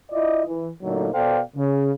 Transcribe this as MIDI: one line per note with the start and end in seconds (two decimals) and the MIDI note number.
0.11 0.42 64
0.11 0.42 65
0.11 0.42 74
0.11 0.42 75
0.46 0.69 52
0.82 1.08 46
0.82 1.08 50
0.82 1.08 54
0.82 1.08 57
0.82 1.08 58
0.82 1.08 63
1.13 1.40 47
1.13 1.40 69
1.13 1.40 72
1.13 1.40 74
1.13 1.40 77
1.13 1.40 79
1.56 1.90 49